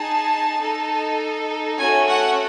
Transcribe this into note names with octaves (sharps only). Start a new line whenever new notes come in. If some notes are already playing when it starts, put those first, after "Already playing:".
Already playing: D#4 G#4 A5
D#4 A4
A3 C#4 F#4 A4 G#5
F#5